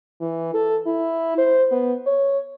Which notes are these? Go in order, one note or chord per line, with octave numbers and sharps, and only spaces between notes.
E3
A4
E4
C5
B3
C#5